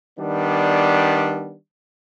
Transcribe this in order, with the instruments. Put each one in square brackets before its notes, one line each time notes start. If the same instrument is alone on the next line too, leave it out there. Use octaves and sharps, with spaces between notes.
[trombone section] D#3 G3 B3 D4